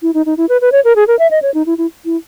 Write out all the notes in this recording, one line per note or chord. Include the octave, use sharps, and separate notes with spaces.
E4
D#4
D#4
E4
B4
B4
C#5
A#4
G#4
A#4
E5
D#5
C#5
D#4
E4
E4
E4